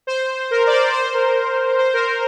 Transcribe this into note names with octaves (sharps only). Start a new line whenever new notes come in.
C5
A#4
D5
C5
C5
A#4
C5
A#4
A#4